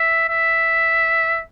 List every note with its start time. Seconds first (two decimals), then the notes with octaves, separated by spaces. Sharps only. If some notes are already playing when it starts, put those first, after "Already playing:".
Already playing: E5
0.29 E5